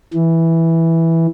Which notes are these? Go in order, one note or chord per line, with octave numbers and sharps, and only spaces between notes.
E3